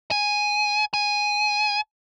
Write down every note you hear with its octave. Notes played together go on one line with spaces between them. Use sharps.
G#5
G#5